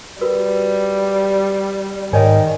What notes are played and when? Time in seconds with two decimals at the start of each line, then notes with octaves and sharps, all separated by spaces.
0.21 G3 F#4 A#4 B4
2.13 G#2 D#3 C#5 D5 G#5